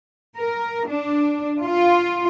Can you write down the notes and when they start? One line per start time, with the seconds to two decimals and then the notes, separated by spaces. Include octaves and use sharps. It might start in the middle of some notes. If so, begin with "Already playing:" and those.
0.38 A#4
0.89 D4
1.64 F4